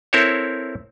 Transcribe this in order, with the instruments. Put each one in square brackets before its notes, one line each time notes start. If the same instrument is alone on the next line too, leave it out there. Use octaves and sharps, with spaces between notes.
[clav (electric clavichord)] C4 E4 A4 A#4 C5 C#5